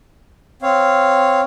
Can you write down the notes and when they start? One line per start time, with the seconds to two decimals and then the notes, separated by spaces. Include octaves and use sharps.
0.62 C4 C#5 F5